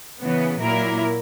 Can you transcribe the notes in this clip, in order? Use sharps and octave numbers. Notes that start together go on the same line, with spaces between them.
C#3 E3 B3
A#2 F#3 A#3 E4 A#4